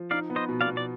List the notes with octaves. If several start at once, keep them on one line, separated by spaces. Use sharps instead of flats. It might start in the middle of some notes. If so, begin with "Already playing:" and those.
Already playing: F3
D#4 D5 F5
B3
C5 D#5
B2
D5 F5
B2
D5